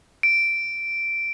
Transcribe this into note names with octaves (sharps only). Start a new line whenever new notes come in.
D7